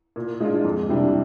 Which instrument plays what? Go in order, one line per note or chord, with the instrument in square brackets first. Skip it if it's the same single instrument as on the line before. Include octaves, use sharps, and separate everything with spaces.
[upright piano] A#2
G#3 D4 F4
F2
C3 G3 D4